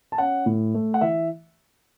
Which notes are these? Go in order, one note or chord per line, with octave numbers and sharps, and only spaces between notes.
A5
C#4 F#5
A2
A3
F#5
E3 E5